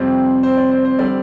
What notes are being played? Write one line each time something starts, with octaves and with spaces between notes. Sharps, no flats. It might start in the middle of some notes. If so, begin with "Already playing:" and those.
Already playing: F2 C3 G3 C4 D5
C5
D5
C5
C5
D3 G3 C4 D5